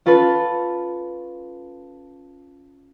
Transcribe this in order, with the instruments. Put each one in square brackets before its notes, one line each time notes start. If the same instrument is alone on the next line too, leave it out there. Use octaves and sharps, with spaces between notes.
[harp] C#4 F4 A4 B4